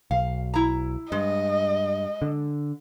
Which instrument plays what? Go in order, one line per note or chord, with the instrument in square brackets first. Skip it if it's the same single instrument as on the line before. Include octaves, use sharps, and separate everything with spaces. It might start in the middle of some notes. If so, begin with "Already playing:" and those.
[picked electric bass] B1 [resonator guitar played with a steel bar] F5
[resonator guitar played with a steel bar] E4 A#5
[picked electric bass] G2 [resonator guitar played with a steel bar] G#3 [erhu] D#5
[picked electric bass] D3